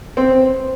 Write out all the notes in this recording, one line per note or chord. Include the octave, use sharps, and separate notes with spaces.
C4